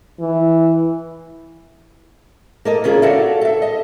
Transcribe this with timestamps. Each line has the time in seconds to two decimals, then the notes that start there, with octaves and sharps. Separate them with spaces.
0.20 E3
2.65 A#3 A4 D#5
2.84 C#3 E3 A#3 C#4 F4 G#4
3.02 F#4 A4 D5 E5 F5
3.41 A4 E5
3.62 D#5